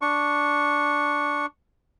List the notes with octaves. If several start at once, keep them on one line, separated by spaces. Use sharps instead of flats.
D4 C#6